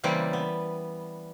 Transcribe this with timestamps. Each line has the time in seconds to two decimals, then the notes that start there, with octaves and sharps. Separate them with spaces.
0.03 C#3 E3 G3 A#3 C4 D5
0.33 B3